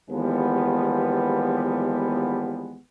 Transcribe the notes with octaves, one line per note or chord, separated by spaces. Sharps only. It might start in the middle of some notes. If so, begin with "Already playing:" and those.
D#2 E3 F3 G3 G#3 B3